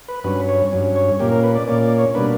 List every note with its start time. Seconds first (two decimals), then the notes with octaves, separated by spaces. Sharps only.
0.08 B4
0.24 G2 F#3 C#4 B4
0.49 C#5
0.72 G2 F#3 C#4
0.96 C#5
1.19 A#2 A#3 C#4 G4
1.31 A#4
1.43 B4
1.55 D5
1.67 A#2 A#3 C#4 D5
1.83 D5
1.98 C#5
2.14 B2 G3 A#3 D4 B4